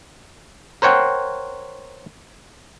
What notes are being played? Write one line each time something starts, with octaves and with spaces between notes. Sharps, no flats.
A#4 C5 C#5 F#5 G5